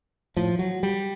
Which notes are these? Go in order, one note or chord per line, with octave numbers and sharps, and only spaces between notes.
A2 F3
F#3
G3